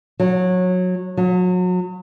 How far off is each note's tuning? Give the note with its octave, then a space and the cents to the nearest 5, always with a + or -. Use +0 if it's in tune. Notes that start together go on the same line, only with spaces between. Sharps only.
F#3 -20
F#3 -30